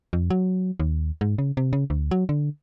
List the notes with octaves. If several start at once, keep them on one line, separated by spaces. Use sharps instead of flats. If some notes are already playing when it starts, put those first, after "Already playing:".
F2
F#3
D#2
G#2
C#3
C3
C#3
D2
F#3
D3